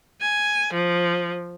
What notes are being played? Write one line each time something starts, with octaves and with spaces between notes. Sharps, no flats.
G#5
F3